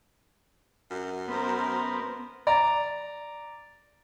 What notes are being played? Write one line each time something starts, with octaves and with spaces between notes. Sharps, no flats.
F#2
B3 A#4 C5
D5 A#5